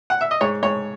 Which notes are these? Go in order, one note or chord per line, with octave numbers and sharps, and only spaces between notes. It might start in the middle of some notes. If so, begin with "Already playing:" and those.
F#5
E5
D#5
G#2 C#5
G#2 C#5